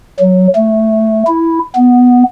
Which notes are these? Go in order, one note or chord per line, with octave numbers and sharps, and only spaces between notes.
F#3
A3
E4
B3